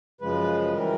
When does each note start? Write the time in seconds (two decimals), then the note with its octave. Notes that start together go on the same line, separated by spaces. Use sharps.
0.21 F#2 C#3 F3 G#3 B4
0.73 E3 G3 A#4